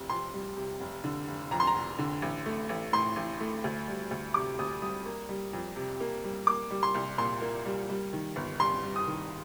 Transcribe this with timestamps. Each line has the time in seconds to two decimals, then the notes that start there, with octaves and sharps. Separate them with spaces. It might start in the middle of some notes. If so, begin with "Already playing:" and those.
Already playing: F1 C3
0.10 F2 C6
0.34 G3
0.57 C3
0.81 F1
1.04 D3
1.28 F1
1.51 F2 A#5
1.60 C6
1.67 A#5
1.75 F1
1.99 D3
2.22 A1
2.46 A3
2.69 A1
2.93 A2 C6
3.16 A1
3.40 A3
3.64 D2
3.88 G3
4.11 D2
4.34 C3 D6
4.59 D2 D#6
4.82 G3 D#6
5.06 A#3
5.29 G3
5.53 F2
5.76 C3
6.00 A#3
6.24 G3
6.47 A#3 D6
6.71 G3
6.83 C6
6.95 C2
7.18 A#2 C6
7.42 A#3
7.66 G3
7.89 G3
8.13 D#3
8.36 G1
8.59 G2 C6
8.84 G3
8.96 D#6
9.07 D#3